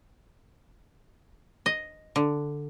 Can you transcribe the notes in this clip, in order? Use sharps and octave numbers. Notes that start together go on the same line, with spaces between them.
D#5
D3